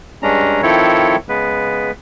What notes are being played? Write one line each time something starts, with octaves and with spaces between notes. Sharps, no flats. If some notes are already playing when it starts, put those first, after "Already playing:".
G2 G#3 C#4 D4 A#5
D#3 F3 C4 E4 A4 C#5
C#3 G#3 B3 B4